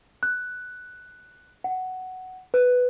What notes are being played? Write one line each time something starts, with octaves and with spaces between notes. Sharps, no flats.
F#6
F#5
B4